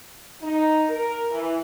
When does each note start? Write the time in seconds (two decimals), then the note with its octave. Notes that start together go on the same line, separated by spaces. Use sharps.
0.42 D#4
0.89 A#4
1.31 E3